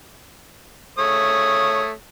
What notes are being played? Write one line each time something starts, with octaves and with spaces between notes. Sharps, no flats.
A3 C#5 D#6